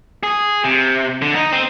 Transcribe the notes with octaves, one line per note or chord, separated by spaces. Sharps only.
G#4
C3
D3
D#4
C4